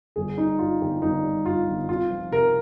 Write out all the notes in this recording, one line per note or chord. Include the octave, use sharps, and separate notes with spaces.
G1 G#4
G3 D#4
G2 F4
G1 G4
G1 D#4
G3
G2 F4
G1
C2 F4
F3
C3 A#4